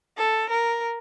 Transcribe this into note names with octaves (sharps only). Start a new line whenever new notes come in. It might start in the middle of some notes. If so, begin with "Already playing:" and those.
A4
A#4